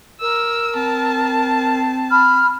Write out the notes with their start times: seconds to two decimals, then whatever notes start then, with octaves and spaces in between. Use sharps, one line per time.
0.21 A#4 E6
0.76 C4 A5
2.11 B5 F6